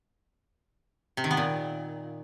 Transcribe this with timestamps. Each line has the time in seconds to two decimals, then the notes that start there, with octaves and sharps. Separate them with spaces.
1.17 C3
1.24 D#3
1.31 B3
1.37 A#2